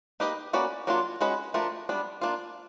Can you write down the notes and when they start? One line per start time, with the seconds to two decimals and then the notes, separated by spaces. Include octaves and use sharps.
0.20 A#3 D#4 G4 B4 D#5
0.53 A#3 C#4 F#4 B4 D5
0.87 F#3 A#3 D4 F4
1.21 G#3 C#4 F#4 B4 D#5
1.54 F3 A3 D4 F4 A#4
1.89 G3 B3 D4
2.21 A#3 D4 F4